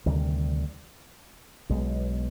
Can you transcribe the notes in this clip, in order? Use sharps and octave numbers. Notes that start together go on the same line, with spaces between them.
D2 C3 D#3 G3
B1 B2 G#3